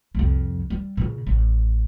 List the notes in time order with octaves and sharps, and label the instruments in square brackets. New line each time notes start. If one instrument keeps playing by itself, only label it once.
[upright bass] C2 F2
G3
A#2 C#3
A1